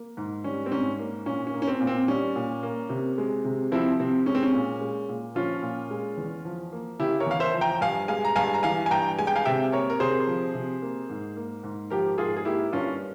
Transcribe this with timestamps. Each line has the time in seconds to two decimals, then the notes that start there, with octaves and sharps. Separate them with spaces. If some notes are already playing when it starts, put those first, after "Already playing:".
Already playing: A#3
0.17 G#2
0.44 G3 C#4
0.66 C4
0.72 G#2 C#4
0.99 A#3
1.26 A#2 C#4
1.47 C#4
1.54 A#3
1.62 C#4
1.68 C4
1.81 A#2
1.87 C4
2.08 G3 C#4
2.36 A#2
2.63 A#3
2.89 C3
3.18 G#3
3.44 C3
3.72 F3 C4 E4
4.00 C3 C4
4.26 G#3 C#4
4.35 C4
4.43 C#4
4.54 A#2
4.81 G#3
5.09 A#2
5.35 F3 C#4 F4
5.62 A#2
5.91 G#3
6.17 E2
6.45 F3
6.72 A#3
6.99 C#3 E4 G4
7.20 A#4 C#5
7.26 E2 F5
7.40 C5 E5
7.54 F3
7.61 G5 A#5
7.81 G2 F5 G#5
8.08 G#3 F5 G#5
8.25 A#5
8.36 G2 F5 G#5
8.54 A#5
8.63 E3 F5 G#5
8.86 G#5
8.91 G2 G5 A#5
9.19 G#3 G#5
9.27 G5
9.36 F5 G#5
9.45 C3 E5 G5
9.72 A#3 A#4 C#5
9.90 A#4
10.00 C3 G#4 C5
10.27 F3
10.54 C3
10.82 A#3
11.10 G#2
11.37 A#3
11.64 G#2
11.90 F3 G4 A#4
12.18 G#2 F4 G#4
12.36 G#4
12.45 A#3 E4 G4
12.73 G2 C#4 F4